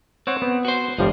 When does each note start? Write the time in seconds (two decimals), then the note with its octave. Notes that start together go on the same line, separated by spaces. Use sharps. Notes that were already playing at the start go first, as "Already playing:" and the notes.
0.27 C4 C5 C#5 F#5
0.42 B3
0.65 F#4 C5
0.98 G1 E3 F3 G3 G#3